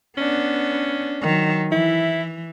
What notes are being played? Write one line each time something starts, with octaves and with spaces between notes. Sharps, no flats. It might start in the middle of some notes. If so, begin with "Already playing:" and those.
B3 C#4 D4
D#3 F#3
E3 E4